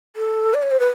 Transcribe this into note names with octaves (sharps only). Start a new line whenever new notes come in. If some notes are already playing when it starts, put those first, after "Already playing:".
A4
D5
C#5
C5
B4